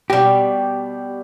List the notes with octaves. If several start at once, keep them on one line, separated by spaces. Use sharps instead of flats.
B2 G3 G4